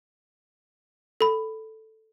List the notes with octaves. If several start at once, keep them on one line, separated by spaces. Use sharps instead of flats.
A4 B5